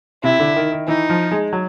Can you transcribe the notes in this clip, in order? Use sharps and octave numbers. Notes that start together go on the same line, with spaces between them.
C3 E4
D3
D#3
D#3
E3 D#4
F3
G#3
F#3